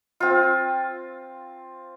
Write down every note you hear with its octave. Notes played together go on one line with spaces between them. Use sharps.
C4 F4